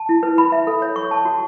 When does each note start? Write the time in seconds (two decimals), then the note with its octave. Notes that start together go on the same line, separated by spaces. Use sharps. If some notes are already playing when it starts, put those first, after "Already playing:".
Already playing: A5
0.09 E4
0.23 B4
0.38 B5
0.52 E5
0.67 A4
0.82 C#5
0.96 C#6
1.11 A5
1.25 F#4